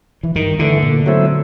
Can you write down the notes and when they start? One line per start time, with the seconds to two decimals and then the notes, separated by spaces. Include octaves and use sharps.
0.23 E3
0.35 G2 D#3
0.59 D3 E3 A3
0.83 A#2
1.06 F#3 A3 C4 E4